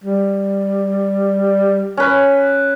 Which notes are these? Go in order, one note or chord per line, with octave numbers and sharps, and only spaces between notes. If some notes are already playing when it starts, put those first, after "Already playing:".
G3
C#4 B4